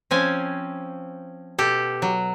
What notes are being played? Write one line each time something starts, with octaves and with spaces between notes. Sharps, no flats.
F3 C4 C#4 G#5
B2 G4 A4
F#3